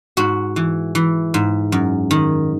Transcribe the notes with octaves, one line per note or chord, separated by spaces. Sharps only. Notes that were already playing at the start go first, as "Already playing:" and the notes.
G#2 F#4
E3
E3
G#2
F#2
D#3